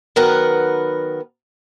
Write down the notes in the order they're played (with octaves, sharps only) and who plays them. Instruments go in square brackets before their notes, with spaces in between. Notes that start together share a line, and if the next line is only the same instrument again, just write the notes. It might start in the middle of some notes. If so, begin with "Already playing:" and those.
[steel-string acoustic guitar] D#3 F#3 B3 A#4 B4 F#5